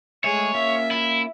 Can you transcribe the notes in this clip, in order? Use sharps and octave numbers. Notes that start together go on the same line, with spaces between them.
G#3 A3 G#4 C#5 E5
A#3 C#4 F4 E5
E4